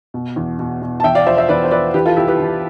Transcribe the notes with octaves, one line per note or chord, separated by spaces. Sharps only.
B2
E2
B2
B2
A5
E2 E5 G5
D5 F5
F3 C5 E5
C5 E5
E2 B4 D5
C5
F3 B4 D5
E3 G4 B4
F4 A4
C2 E4 G4
G4 B4
E3